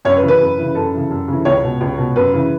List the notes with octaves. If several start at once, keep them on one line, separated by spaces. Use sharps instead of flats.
F#2 C#5
B4
C#3 E3
B4
F#2
C#3 E3
F#2 A4
C#3 E3
F#2
C#3 E3
C#2 C#5
B2
C#2
B2
F#2 B4
C#3 E3